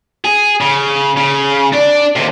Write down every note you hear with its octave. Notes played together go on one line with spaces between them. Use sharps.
G#4
C#3
C#3
D4 D5
D#2 C3